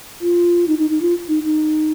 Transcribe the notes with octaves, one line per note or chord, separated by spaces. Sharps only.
F4
D#4
D#4
D#4
F4
D#4
D#4